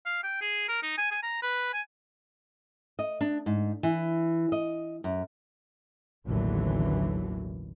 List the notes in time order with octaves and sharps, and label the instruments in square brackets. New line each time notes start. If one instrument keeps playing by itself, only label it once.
[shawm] F5
G5
G#4
A#4
D#4
G#5
G#5
A#5
B4
G#5
[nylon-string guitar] D#5
D4
G#2
E3
D#5
F#2
[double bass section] A1 D#2 B2 D3 E3 F#3